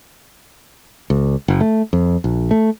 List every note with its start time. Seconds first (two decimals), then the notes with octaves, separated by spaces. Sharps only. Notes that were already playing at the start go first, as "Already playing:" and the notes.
1.10 C#2
1.48 F#1
1.61 A3
1.93 F2
2.24 A#1
2.51 A3